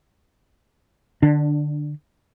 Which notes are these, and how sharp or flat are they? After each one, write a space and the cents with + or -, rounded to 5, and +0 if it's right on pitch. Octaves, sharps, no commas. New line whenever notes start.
D3 +20 D4 +0